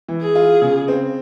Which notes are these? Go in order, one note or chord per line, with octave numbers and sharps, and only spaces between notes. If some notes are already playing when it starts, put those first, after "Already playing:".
E3
G#4
F4
C#3
C4